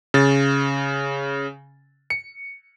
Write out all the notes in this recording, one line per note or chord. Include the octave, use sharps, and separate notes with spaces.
C#3 A6
C#7